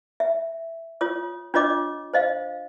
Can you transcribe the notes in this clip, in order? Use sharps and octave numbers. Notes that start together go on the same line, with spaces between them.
E5
F4 C#5 D#6
D4 F4 C#5 D#5 D6
C5 D#5 F5